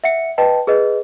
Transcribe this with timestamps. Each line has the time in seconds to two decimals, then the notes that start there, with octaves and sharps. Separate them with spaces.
0.04 E5 F#5 C#7
0.38 B4 D#5 G5 A5
0.67 G#4 B4 D#5